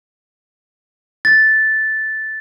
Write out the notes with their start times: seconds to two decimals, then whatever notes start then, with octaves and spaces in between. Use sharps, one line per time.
1.25 A6